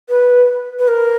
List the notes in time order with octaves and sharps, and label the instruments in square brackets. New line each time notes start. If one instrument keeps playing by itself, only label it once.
[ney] B4
B4
A#4